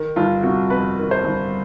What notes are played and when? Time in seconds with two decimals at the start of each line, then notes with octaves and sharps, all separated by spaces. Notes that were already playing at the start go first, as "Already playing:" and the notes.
Already playing: D#3
0.16 G1 F4
0.43 C3 F#4
0.70 F2 B4
0.98 D#3
1.11 C5
1.24 G1